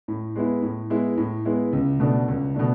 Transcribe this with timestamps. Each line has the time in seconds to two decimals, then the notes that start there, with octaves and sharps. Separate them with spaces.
0.08 A2
0.36 G#3 B3 E4
0.62 A2
0.90 G#3 B3 E4
1.18 A2
1.45 G#3 B3 E4
1.73 C#2
2.00 B2 A3 D4
2.28 C#2
2.55 B2 A3 D4